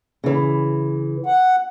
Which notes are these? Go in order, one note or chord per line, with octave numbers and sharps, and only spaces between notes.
C#3 E3
F#5